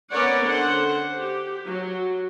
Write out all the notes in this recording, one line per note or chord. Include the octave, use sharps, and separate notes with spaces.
B3 C#4 A#4 C#5 D5 F#5
D3 C5 F#5
G4
F#3